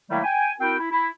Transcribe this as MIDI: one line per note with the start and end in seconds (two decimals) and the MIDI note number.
0.10 0.19 51
0.10 0.19 54
0.10 0.19 55
0.10 0.19 57
0.10 0.19 58
0.10 0.19 64
0.24 0.51 79
0.24 0.51 80
0.60 0.77 60
0.60 0.77 64
0.60 0.77 66
0.60 0.77 70
0.60 0.77 79
0.79 0.89 64
0.91 1.09 64